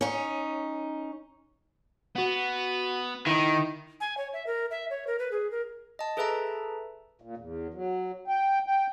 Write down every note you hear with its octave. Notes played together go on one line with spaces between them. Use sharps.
C#4 D#4
B3 F#4 F#5
D#3 D#4 E4
G#5
C#5
E5
A#4
E5
C#5
A#4
B4
G#4
A#4
D#5 A5
G#4 A4 B4 E5 A5 A#5
A#2
E2
F#3
G5
G5